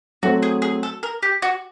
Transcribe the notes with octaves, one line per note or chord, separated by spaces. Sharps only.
F#3 A3 C4 F#4
G#4
G#4
A4
A#4
G4
F#4